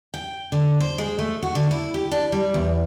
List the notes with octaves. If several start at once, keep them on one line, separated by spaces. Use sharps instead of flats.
G5
D3
C5
G#3
A3
F#4
D3
E4
G4
D4
G3
E2